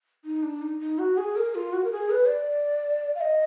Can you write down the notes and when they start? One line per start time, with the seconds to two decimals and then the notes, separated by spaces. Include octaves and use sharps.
0.25 D#4
0.43 D4
0.62 D#4
0.80 D#4
0.99 F#4
1.17 G#4
1.36 A#4
1.55 F4
1.73 F#4
1.84 A#4
1.92 G#4
2.10 B4
2.28 D5
3.15 F5
3.21 D#5